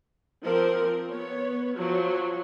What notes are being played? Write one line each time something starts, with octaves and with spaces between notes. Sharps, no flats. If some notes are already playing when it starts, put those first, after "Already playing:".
F3 C4 A#4
B3 C#5
F3 F#3